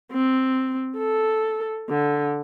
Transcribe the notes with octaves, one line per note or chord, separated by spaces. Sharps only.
C4
A4
D3